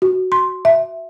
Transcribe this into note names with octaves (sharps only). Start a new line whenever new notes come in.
F#4
C6
E5